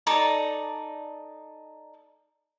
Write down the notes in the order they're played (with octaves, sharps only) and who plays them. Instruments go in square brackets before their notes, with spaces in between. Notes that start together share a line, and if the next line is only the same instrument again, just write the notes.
[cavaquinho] D#4 A4 D5 A#5